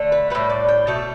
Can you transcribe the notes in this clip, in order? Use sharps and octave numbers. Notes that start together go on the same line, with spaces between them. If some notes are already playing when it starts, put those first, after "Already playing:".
Already playing: D3 A3
B4
A2 G3 B4
D5
G5
B2 A3 A5